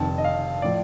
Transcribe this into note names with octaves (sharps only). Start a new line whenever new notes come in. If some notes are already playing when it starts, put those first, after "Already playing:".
Already playing: F1 F2 D#3 A5
D#5
F5
A2 F3 D5